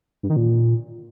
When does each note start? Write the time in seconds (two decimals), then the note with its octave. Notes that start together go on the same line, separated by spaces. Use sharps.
0.23 G2
0.30 D#3
0.36 A#2